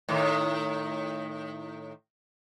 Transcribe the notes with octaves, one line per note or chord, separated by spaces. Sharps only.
A2 D#3